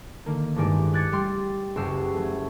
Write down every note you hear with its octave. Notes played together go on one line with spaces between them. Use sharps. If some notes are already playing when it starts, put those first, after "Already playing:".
D3 D#3 A#3
A1 G2 D#3 G#3 D5
D6 F#6 G#6 A6 B6 C#7
G3 G5 C6
F#1 C#2 F#4 G4 E6 C7
F#3 A3